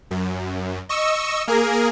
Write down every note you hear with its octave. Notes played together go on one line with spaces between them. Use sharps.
F#2
D#5 C#6 E6
A#3 G#4 A#4